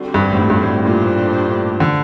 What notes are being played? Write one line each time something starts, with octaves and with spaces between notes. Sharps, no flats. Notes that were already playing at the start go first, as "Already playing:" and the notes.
Already playing: D3 G3 C4 F#4 C5
G2
A2
G2
G2
A2
A#2 A3 D4 G4 C5
D3